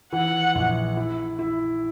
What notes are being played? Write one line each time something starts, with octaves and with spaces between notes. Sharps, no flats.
E3 F#5
A#1
E4
E4